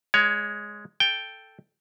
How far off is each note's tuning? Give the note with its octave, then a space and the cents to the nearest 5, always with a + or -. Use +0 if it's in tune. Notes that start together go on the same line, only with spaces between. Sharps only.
G#3 +0 C#5 +20
A4 +0 G5 +0